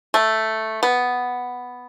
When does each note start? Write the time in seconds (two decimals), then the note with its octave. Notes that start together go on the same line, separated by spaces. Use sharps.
0.14 A3
0.83 B3